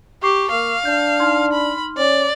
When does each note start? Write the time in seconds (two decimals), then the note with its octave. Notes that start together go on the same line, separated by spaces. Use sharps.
0.23 G4 C#6 D6 C7
0.51 A#3 F5
0.85 D4 G6
1.19 D#4 C6 F6
1.53 B5
1.97 C#4 D5